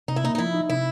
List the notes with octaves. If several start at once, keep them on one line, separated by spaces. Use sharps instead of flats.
C3 D#4
E4
A#3 D#4
D#4
F3 E4
D#4
C3 E4